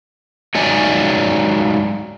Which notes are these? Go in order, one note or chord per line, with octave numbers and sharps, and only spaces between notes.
F#3 G#3 D#4 C#5 D5 G#5